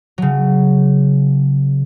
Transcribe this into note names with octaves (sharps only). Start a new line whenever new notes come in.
C#3 F#3